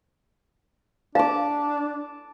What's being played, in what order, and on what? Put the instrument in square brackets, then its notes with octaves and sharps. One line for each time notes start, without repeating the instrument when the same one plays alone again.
[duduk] D4 [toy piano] F5 [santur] A5 D6